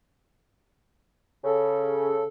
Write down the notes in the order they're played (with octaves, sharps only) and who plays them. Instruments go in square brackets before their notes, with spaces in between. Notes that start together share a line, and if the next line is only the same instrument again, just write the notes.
[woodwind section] C#3 [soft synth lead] A4